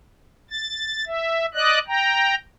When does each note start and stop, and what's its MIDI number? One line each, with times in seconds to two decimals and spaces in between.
0.50 1.04 93
1.07 1.46 76
1.54 1.79 74
1.54 1.79 75
1.54 1.79 90
1.88 2.35 79
1.88 2.35 82